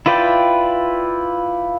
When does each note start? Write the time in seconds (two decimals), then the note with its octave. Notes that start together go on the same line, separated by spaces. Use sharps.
0.06 E4 F4 B4 D5 G5